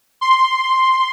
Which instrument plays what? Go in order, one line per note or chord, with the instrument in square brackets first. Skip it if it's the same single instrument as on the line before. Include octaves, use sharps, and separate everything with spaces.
[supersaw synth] C6